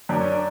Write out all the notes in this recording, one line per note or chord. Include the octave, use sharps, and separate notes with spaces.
F#2 D4
C#4
D4